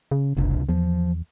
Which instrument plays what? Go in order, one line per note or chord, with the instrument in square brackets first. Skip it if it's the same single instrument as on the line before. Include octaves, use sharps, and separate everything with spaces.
[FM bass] C#3
[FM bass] F#1 [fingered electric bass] C#2 C3 D4
[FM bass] E2 [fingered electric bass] F3